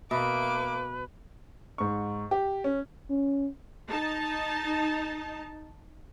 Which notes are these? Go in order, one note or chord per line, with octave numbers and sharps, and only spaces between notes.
B2 A#3 B4 E5 D6
G#2 C#6
G4
C#4
C#4
D#4 A5